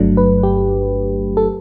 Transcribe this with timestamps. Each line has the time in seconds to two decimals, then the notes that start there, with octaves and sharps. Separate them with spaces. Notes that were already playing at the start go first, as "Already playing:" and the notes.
Already playing: G1 G2 F#3 A3 D4
0.17 B4
0.43 G4
1.37 A4